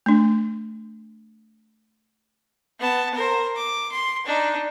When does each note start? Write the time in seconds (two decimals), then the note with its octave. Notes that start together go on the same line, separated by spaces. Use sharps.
0.06 A3 D4
2.80 B3 A5
3.15 A#4 C5
3.56 D6
3.92 C6
4.26 D4 D#4